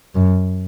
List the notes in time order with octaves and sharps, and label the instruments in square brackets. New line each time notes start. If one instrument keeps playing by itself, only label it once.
[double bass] F#2